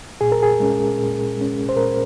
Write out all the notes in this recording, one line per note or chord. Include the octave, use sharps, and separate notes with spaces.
A#2 G#4
A#4
G#4
G#3 C#4
A#2
G#3 C#4
C5
A#2 A#4